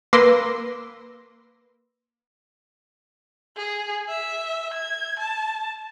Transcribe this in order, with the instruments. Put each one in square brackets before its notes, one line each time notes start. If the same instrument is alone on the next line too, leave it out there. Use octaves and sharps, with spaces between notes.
[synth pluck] A#3 B4 C6 D6 E6 A#6
[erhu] G#4
E5
G#6
A5